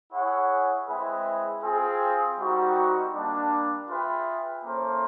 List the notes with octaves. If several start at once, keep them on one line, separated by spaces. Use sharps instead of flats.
E4 G#4 C#5 F#5
G#3 C4 E4 G#4 B4
C4 F4 G#4
G3 C4 D#4 F#4 A#4
G3 A#3 D4
F4 G#4 B4 E5 G5
A#3 C#4 E4 A4 C5